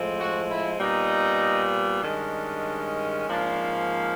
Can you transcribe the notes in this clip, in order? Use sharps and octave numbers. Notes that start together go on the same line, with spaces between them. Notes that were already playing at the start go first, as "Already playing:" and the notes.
Already playing: A2 F3 G#3 C4
F#4
E4
A#2 G3 B3 D#4
G2 D#3 G#3 C#4 D4
G#2 F3 A#3 C#4 D4